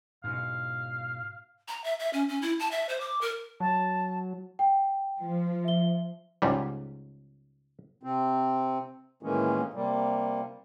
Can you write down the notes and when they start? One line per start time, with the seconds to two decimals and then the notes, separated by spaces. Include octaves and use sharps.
0.24 G#2 B2 F5
1.68 A#5
1.84 E5
2.00 E5
2.13 C#4
2.29 C#4
2.42 E4
2.59 A5
2.71 E5
2.89 C5
3.00 D6
3.21 A#4
3.60 F#3 A5
4.59 G5
5.21 F3
5.64 E5 G7
6.42 C#2 G#2 G3
8.03 C3 C4
9.23 A2 D#3 E3 G#3 A#3 C#4
9.74 C3 G3 A#3